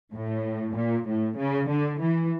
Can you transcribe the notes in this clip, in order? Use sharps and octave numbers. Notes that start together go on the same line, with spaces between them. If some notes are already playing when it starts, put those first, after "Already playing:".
A2
A#2
A2
C#3
D3
E3